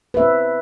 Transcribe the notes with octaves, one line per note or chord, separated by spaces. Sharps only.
C4 B4 E5